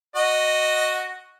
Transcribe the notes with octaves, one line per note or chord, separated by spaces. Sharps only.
F#4 D#5